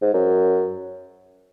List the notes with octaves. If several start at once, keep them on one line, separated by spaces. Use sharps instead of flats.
G#2
F#2